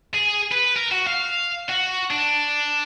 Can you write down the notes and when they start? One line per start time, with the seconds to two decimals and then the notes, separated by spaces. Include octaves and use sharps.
0.15 G#4
0.52 B4
0.76 A#4
0.92 F#4
1.07 F5
1.69 F#4
2.11 D4